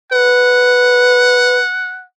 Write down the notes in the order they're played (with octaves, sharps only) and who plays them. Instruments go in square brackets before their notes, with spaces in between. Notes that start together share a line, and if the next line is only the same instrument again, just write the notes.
[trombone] B4 [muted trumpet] F#5